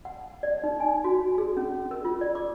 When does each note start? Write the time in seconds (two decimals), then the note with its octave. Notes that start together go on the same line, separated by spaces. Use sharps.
0.05 F#5
0.43 D5
0.63 D#4
0.80 G#5
1.04 F#4
1.38 G#4
1.57 C#4
1.91 A#4
2.05 F4
2.21 D5
2.35 D6